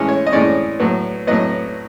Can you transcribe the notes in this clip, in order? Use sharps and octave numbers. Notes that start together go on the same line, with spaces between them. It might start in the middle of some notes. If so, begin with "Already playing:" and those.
Already playing: A2 E3 G#3 C#4
C#5
D#5
A2 E3 G#3 C#4 D5
A2 F#3 B3
A2 F#3 B3 D#5